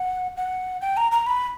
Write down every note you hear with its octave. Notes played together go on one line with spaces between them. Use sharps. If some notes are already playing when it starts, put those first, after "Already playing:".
Already playing: F#5
F#5
G5
A#5
A#5
B5